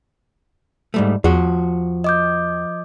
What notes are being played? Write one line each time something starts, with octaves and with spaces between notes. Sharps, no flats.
G#2 G3 A3
E2 F3 F#4
D#5 D6 G6